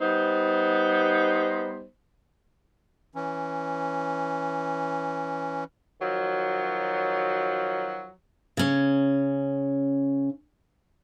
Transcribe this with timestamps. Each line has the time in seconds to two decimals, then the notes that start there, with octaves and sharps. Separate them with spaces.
0.01 G3 B3 D#4 C5
3.15 E3 C#4
6.01 D#3 F3 F#3
8.57 C#3 C#4